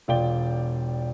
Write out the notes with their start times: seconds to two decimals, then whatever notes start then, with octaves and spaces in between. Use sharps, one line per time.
0.08 E1 F4 D5 G5 G7